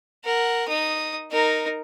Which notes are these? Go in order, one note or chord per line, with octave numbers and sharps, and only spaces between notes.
A#4 F#5
D#4 D#6
D#4 A#4